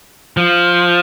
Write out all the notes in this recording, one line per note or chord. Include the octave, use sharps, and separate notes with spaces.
F3